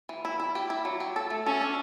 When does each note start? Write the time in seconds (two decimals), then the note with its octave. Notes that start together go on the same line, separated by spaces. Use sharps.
0.09 E3
0.25 E4
0.40 E4
0.55 G4
0.70 E4
0.85 F#3
1.00 G4
1.16 A4
1.30 A3
1.46 C#4 A4
1.61 D4